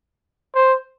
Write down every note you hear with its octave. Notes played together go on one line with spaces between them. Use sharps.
C5